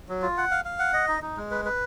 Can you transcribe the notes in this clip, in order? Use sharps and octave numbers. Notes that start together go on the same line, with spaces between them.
F#3
F4
F#5
F5
F5
F#5
D#5
D#4
D#4
G#3
B4
B4